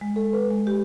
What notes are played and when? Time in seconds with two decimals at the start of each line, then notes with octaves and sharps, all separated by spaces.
0.01 G#3
0.16 A4
0.33 B4
0.50 G#3
0.67 G4